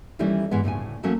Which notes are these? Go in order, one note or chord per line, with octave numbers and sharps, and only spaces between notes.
D#3 E3 G3 A3 C#4 E4
G#2 E3 G#3 B3
D2 A2 C#3 G#5
E3 F#3 A3 A#3 C#4